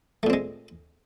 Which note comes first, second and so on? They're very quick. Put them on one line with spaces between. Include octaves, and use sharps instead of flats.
A3 A#2 C4 G#3